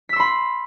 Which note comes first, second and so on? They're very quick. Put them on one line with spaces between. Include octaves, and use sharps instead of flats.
B6 E6 C6 B5